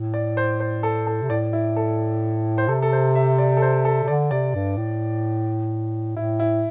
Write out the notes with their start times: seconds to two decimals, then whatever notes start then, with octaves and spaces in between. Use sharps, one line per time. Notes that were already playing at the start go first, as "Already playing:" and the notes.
Already playing: A2
0.14 D5
0.37 C5
0.60 C5
0.83 A4
1.07 A4
1.22 C3
1.30 A2 D5
1.53 E4
1.76 A4
2.58 C5
2.68 C3 A4
2.82 A4
2.92 C5
3.15 E5
3.38 D5
3.57 A4
3.62 C5
3.85 A4
4.03 C3
4.08 D3 D5
4.31 C3 D5
4.55 G2
4.77 A2
6.17 A2 E4
6.40 E4